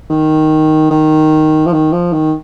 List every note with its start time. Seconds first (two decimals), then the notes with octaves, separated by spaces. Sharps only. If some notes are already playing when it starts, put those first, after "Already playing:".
0.10 D#3
0.90 D#3
1.66 F3
1.72 D#3
1.92 F3
2.12 D#3